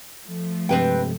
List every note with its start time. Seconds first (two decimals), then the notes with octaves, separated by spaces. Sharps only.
0.25 F3 A3
0.69 G2 C3 G#3 C4 B4 G5